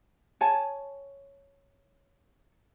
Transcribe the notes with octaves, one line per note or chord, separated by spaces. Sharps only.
C#5 G#5 A5